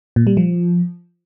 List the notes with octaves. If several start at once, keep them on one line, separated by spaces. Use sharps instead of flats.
A#2
G3
F3